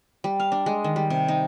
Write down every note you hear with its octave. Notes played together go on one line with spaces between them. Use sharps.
G3
F5
D4
G#3
D#3
G3
C3
D#4